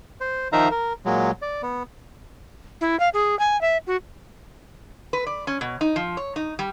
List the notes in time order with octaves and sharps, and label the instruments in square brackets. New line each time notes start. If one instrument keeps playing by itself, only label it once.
[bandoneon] C5
D#3 F3 D#4 E5 F5 A#5
A#4
A#2 F#3 G#3
D5
B3
[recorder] E4
F5
G#4
G#5
E5
F#4
[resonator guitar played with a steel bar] B4
D5
C#4
B2
D#4
F3
C#5
D#4
G3